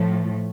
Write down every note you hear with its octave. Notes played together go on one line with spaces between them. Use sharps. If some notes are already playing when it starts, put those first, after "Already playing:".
Already playing: A2 F3 A3